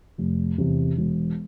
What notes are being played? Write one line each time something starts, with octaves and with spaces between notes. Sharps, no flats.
F1
E2 C3
E1